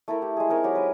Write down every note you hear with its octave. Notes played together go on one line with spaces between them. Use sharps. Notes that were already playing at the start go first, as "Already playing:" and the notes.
A3 E4 A4 A#4
G4
G#3 G#4
C4 D#4 A#4 C#5
F#3 G4
G#3 A#4 B4